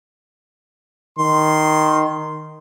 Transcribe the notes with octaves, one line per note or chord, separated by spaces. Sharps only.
D#3 C6